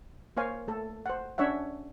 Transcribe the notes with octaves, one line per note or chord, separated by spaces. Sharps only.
A#3 C5 C#5 F5 G#5
A3 A4
C5 F#5
C#4 D4 C#5 E5 F#5